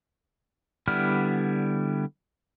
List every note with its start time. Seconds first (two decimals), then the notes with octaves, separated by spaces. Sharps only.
0.88 D3 G3 B3 E4 F6